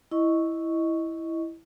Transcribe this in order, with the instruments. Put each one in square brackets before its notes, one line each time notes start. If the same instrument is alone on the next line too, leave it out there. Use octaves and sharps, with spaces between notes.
[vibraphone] E4 D#5 C#6